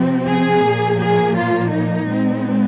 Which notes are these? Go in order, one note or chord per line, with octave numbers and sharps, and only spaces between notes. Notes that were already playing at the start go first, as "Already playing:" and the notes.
Already playing: C3 F3 C4
G#4
A#2 F3 A#3
G#4
F4
D#4
A#2 G#3 C4